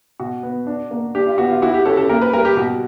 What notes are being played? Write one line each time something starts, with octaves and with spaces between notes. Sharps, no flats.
B2 F#4
B3
D4
A#3
D4 G4
F4
B3 F#4
F4
E4 F#4
G4
C#4 A4
A4
A#3 A#4
B4
G3 A#4
G4
B2 F#4